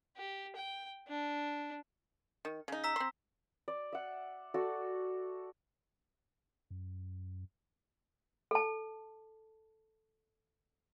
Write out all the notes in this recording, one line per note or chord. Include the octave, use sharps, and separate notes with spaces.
G4
G5
D4
D#3
C#3 D#4
A#5 E6 B6
C4 C6
D5
E5 F#5
F#4 A4 D5
F#2
A4 A5